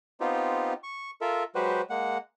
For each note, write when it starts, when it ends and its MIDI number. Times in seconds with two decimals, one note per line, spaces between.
0.20 0.73 59
0.20 0.73 60
0.20 0.73 63
0.20 0.73 65
0.20 0.73 67
0.83 1.11 85
1.21 1.43 65
1.21 1.43 69
1.21 1.43 70
1.21 1.43 76
1.55 1.82 54
1.55 1.82 56
1.55 1.82 66
1.55 1.82 67
1.55 1.82 71
1.55 1.82 72
1.90 2.18 56
1.90 2.18 58
1.90 2.18 78